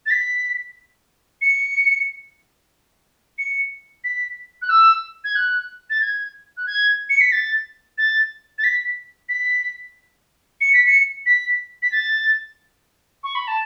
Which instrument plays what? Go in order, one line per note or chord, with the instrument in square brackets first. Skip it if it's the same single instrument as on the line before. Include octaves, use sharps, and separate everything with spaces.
[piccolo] A6
B6
C#7
C#7
B6
F#6
E6
G#6
F#6
A6
G#6
F#6
G#6
C#7
B6
A6
A6
A6
B6
B6
C#7
B6
C#7
B6
B6
A6
C#6
B5
A5